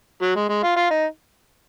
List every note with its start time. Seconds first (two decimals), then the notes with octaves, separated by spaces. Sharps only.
0.22 F#3
0.36 G#3
0.49 G#3
0.63 F4
0.76 F4
0.91 D#4